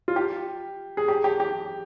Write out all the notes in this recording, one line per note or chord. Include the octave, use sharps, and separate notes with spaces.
F4
G4
G#4
G4
G4
G4